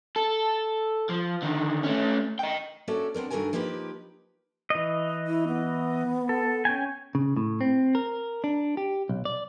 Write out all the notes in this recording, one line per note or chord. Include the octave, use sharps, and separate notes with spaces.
A4
F3
D3 D#3
A3 C#4
D#5 G5
A#3 C#4 F#4 A4 D5 E5
B3 C4 D4 A#4
G2 D#3 F#4 A4 A#4 G#5
F3 A#3 D#4 G4 G#4 B4
E3 D#5
E4
B3
A4
C#4 G5 G#5
C#3
A2
C4
A#4
D4
G4
B1
D5